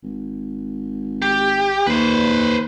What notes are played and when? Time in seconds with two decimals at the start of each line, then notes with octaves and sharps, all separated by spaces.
0.03 G#1
1.22 G4
1.87 D#2 B4 C5